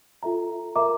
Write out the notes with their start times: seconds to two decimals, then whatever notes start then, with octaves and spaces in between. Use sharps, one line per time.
0.23 F4 A4 E5 A#5
0.76 A#4 E5 A#5 D6